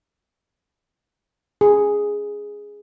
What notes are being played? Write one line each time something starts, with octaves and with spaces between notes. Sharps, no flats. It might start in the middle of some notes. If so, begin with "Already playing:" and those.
G#4